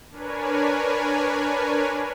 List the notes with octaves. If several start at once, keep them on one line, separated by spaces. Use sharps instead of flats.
D4 A#4 B4 C#5 G#5